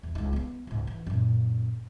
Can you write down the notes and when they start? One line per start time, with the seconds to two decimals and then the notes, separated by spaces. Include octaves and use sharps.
0.03 E2
0.15 C#2 D#4
0.33 A#3 B3
0.67 C#2 G#2
0.87 E3
1.07 F#2 A#2